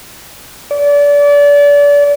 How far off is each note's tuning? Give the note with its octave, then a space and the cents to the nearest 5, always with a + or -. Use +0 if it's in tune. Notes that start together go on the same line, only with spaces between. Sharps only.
D5 -30